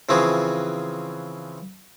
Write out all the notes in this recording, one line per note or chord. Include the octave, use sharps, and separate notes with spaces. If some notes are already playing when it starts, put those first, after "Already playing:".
C#3 E3 F3 C4 F#4 G#4